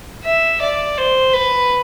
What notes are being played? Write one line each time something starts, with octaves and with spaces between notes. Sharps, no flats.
E5
D5
C5
B4